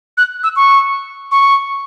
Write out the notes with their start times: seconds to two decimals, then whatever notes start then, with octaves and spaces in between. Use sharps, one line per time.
0.17 F#6
0.43 E6
0.56 C#6
1.31 C#6